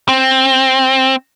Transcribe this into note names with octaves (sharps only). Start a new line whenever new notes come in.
C4